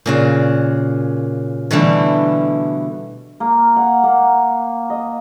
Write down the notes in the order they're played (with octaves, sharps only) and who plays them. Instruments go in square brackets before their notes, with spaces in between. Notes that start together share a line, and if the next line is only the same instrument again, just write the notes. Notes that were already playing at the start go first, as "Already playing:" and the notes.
[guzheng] A#2 C#3 F#4
B2 D3 E3 G3 A3
[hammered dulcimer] A#3
F#5
A#3
D#5